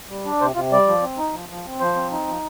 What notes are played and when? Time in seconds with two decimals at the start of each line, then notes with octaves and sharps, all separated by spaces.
0.09 G3
0.25 D4
0.41 C3 C5
0.55 C3 F4
0.72 G3 D5
0.88 F3
1.02 C4
1.18 D#4
1.34 F3
1.49 F3
1.65 C4
1.80 F3 C5
1.95 C4
2.11 D#4
2.27 F3